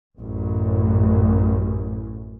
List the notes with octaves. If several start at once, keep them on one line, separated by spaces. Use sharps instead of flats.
A1 F#2